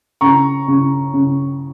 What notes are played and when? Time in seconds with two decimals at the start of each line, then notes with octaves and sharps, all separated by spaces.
0.21 C#3 A#5 C#6
0.68 C#3
1.13 C#3